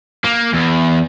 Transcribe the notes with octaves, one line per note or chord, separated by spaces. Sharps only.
A#3
E2